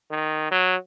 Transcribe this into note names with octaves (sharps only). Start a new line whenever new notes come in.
D#3
F#3